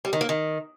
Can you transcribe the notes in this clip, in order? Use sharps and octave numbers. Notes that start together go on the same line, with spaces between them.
G3
D#3
A#3
D#3